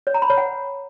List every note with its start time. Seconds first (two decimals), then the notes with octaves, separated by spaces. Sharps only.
0.07 C#5
0.14 A#5
0.22 B5
0.30 C#5
0.37 F#5